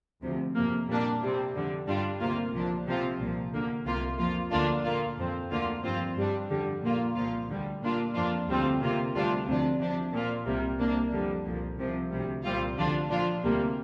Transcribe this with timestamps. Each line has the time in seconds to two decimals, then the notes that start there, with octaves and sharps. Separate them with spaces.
0.22 D2 C3 F3
0.55 F2 C3 A#3
0.88 A#2 G3 A#3 D4
1.22 C3 G3 C4
1.54 F2 D3 G3
1.87 G2 G3 D4 F4
2.20 D2 C3 A#3 F4
2.53 C2 A#2 F3 D4
2.87 C3 F3 C4 F4
3.19 C2 A#2 F3
3.53 D2 D3 A#3
3.85 C2 C3 A#3 F4
4.19 F2 F3 A#3 F4
4.51 D2 D3 A#3 D4 F4
4.84 A#2 A#3 F4
5.17 F2 F3 C4
5.51 D2 D3 A#3 F4
5.84 G2 F3 C4 F4
6.16 G2 G3 D4
6.49 F2 D3 G3
6.82 A#2 A#3 F4
7.15 C2 A#2 F3 A#3 F4
7.48 D2 D3 G3
7.82 A#2 A#3 D4 F4
8.14 F2 F3 A#3 D4 F4
8.48 D2 C3 G3 C4 F4
8.81 C3 A#3 F4
9.14 D2 C3 G3 D4 F4
9.47 D2 C3 F3 D4
9.79 C3 F3 D4
10.13 A#2 F3 A#3 F4
10.46 C2 C3 G3 A#3
10.78 C2 C3 A#3 D4
11.12 F2 D3 G3
11.45 C2 A#2 F3
11.78 C2 C3 F3
12.11 D2 C3 G3
12.44 C2 A#2 G3 C4 F4
12.76 D2 D3 F3 D4 F4
13.10 A#2 F3 D4 F4
13.43 D2 C3 G3 A#3